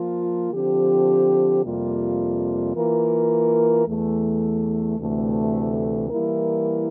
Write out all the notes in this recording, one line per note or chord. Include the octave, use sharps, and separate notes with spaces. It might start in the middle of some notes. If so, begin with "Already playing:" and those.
Already playing: F3 A#3 F4
D3 F3 C4 G4
F2 C3 G3 A#3 F4
E3 A#3 F4 A#4
E2 E3 A3
D2 C3 E3 A3
E3 G3 A#3 E4 A#4